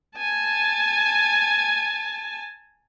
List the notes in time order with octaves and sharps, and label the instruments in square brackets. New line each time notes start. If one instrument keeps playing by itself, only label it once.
[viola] G#5 A5